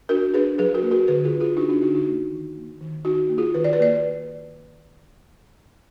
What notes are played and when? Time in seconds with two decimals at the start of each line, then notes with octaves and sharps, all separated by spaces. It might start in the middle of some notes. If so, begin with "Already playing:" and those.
0.09 D4 F#4 A#4
0.34 D4 G#4 B4
0.58 F#3 G#4 B4
0.74 F#4 A#4
0.83 A#3
0.91 F#4 A#4
1.07 D3 G#4 B4
1.24 F4 G#4
1.33 D4
1.40 F4 G#4
1.57 D4 D#4 F#4
1.69 D4 F4
1.81 D3 D#4 F#4
1.94 D#4 F#4
2.06 A#3
2.31 D#3
2.56 A#3
2.81 D#3
3.05 D#3 D#4 F#4
3.29 A#3
3.38 F4 G#4
3.54 D#3 B4
3.64 D5
3.73 B4
3.80 A#3 D5